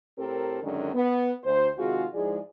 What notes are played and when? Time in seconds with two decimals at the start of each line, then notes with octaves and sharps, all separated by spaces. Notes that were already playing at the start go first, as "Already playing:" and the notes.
0.18 A2 C4 G4 A4 A#4
0.63 F#2 D3 D#3 G#3 D4
0.94 B3
1.44 D2 C5
1.78 C3 D#3 G#3 F4 F#4 G#4
2.13 G#2 F3 G#3 E4 G#4 D5